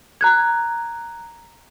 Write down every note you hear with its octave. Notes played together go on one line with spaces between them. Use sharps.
A#5 F#6 G#6